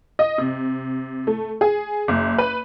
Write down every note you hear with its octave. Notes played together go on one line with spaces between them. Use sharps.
D#5
C3
A3
G#4
F#1
B4